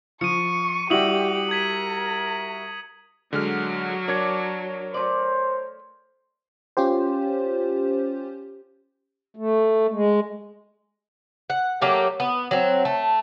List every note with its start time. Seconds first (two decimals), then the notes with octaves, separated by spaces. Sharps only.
0.21 F3 C#6 C#7 D#7
0.90 G3 E4 F#4 G4 D#6 F#7
1.51 A#4 G#6 B6 D#7
3.33 D3 F#3 G#3 F6
4.08 D4 A#4 C#5 G#6
4.94 A3 C5 D5
6.77 C#4 F4 G4 C5
9.36 A3
9.92 G#3
11.50 F#5
11.81 F#3 A3 A#3 G4
12.20 B3
12.51 F#3 C4
12.85 A3